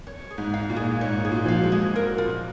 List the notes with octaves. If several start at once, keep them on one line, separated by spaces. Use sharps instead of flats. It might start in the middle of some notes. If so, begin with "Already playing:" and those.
C#5
G#4
G#2
F5
A#2
G#4
G#2 C#5
G#4
A#2
F3 F5
F#3
G#3
G#4
A#4
F4